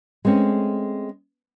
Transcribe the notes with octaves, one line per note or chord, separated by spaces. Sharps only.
G#3 A3 C4 C#4